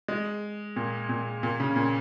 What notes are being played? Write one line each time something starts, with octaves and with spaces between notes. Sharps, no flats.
G#3
A#2
A#2
A#2
C#3
A#2